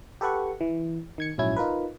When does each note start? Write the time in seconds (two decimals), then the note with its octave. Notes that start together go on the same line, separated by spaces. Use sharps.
0.21 G4 A4 B4 F#5 C#6
0.61 E3
1.18 D#3 G#6 C#7
1.38 A#1 G#2 F#3 C#4 E4 G#6
1.56 D#4 F4 A#4 B4